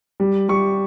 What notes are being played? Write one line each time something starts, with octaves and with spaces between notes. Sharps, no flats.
G3
G3 C#6